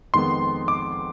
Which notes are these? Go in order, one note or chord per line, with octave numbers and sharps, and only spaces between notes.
F2 D#3 G#3 B3 C6
D6